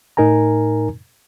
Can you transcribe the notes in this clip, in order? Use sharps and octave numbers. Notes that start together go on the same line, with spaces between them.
A2 D#4 A#4 G#5 A#5